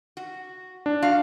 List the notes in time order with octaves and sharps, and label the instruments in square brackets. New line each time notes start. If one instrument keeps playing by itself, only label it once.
[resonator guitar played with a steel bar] F#4
[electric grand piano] D4
[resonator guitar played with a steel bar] F#4 F5